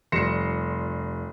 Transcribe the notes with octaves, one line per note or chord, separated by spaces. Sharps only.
F1 G3 C6 A#6 C#7 E7